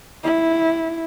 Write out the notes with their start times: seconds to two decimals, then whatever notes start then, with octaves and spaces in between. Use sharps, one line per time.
0.23 E4